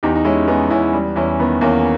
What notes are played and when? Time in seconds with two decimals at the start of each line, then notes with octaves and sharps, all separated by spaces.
0.03 E2 D#4 G4
0.16 D#4
0.25 G#3 C#4 E4
0.48 G#3 B3 D#4
0.70 E2 C#4 E4
0.93 G3
1.16 E2 C#4 E4
1.39 D#3 B3
1.61 E2 A#3 C#4